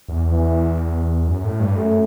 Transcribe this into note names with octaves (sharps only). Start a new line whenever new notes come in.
E2
E3
F#2
A2
G2
F#2 A3